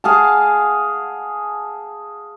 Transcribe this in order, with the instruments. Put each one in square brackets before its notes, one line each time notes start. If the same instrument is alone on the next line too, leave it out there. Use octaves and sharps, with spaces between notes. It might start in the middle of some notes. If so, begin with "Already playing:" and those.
[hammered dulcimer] G#4 F5 F#5 A5